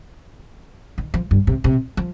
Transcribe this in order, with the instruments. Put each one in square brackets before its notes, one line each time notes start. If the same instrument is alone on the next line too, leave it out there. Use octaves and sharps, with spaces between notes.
[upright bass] D#3
F3
G2
C3
C3
F3